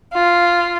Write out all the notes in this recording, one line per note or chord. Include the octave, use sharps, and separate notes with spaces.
F4